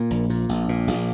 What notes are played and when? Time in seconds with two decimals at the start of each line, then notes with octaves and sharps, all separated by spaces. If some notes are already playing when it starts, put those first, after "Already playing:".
Already playing: A#2 A#3
0.11 A#1
0.30 A#2
0.49 A#1
0.69 A#2
0.87 A#1